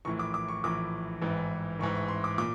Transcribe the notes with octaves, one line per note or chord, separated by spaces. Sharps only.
A#1 A2 E3 C#6
D6
D6
C#6
A#1 A2 E3 D6
A1 G#2 E3
A1 G#2 E3 C#6
C#6
C6
D6
A#2 D6